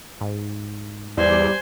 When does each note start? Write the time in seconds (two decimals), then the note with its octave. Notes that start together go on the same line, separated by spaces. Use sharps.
0.21 G#2
1.17 E2 G3 C5 D5 G#5